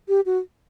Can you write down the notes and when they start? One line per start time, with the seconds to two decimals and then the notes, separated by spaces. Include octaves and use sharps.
0.09 G4
0.26 F#4